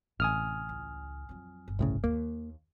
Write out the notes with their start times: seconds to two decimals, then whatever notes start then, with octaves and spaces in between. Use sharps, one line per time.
0.20 A1 C3 G#5 D#6 F6
0.69 C#2
1.29 F2 F#3
1.68 G1
1.79 C2 A2 C#3
2.04 D#2 A#3